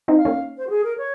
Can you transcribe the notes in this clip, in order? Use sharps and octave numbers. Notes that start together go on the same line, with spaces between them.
C4 D#4
F5
A#3 C#4
C5
F#4
G#4
A#4
C#5